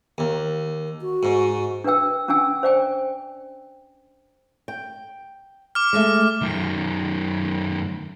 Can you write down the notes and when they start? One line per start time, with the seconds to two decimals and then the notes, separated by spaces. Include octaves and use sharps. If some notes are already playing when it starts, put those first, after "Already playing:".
0.18 D#2
1.02 F#4
1.23 G#2
1.84 D4 A#4 B4 G5 E6
2.28 C#4 D4 G5 G#5 E6
2.63 C5 D5 G5 G#5
4.68 G5
5.75 D6 F6
5.93 G#3 A3 E5
6.42 F#2 D#3